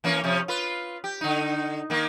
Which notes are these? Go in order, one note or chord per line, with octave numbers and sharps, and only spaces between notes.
E3 A#3 C#4
C3 F3 C#4
F4 B4
G4
D3 D#4
D#3 A#3